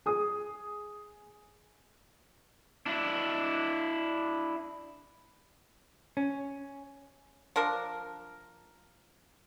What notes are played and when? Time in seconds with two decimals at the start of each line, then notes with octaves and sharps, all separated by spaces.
0.06 G#4 D#6
2.86 D4 E4
6.17 C#4
7.56 F3 D4 A#4